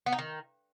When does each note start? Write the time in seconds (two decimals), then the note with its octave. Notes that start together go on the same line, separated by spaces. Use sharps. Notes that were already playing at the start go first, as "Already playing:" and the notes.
0.06 B3
0.12 D#4
0.19 D#3